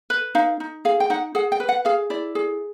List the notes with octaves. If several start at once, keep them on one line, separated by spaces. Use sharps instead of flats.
B4
D#4 F5
D#4
G#4 F5
G5
D#4 F#5
G#4 F#5
G5
B4
F#5
G#4 F5
E4 D5
G#4